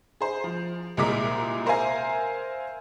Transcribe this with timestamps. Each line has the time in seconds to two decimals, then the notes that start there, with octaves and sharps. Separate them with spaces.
0.21 G#4 C5
0.44 F3
0.97 C2 A#2 G#3 A#5 D6 B6
1.66 A#4 C5 E5 F5 G#5 A#5